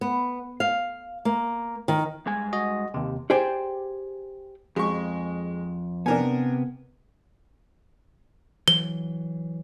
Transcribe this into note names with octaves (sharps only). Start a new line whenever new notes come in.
B3
F5
A#3
D#3
G2 G#3 G#5
F#4 D#5
D#2 C3
G4 G#4 C5 D5 G5
F2 G#3 C#6
C3 B3 D4 A#4 G#5
E3 F#3 G7